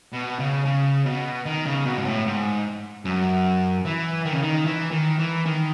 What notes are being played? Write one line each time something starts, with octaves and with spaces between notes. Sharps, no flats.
B2
C#3
C#3
B2
D#3
C#3
B2
G#2
A2
G#2
F#2
E3
D#3
C#3
D#3
E3
D#3
E3
D#3